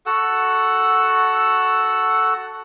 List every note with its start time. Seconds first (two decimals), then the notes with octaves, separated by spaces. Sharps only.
0.06 F#4 A4 F#5 E6